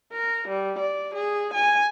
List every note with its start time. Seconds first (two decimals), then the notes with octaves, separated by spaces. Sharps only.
0.12 A#4
0.48 G3
0.78 D5
1.15 G#4
1.54 G#5